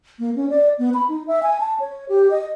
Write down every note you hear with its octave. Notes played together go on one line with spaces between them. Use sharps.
A#3
C#4
D5
B3
B5
D#4
E5
G#5
A5
C#5
G4
D#5